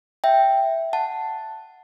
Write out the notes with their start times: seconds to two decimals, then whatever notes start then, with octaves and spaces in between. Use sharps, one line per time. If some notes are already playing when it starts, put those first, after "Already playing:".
0.24 E5 G5
0.93 F#5 A5